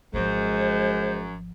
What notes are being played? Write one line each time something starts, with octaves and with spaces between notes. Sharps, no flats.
G#1 F#2 F3 G#3 C5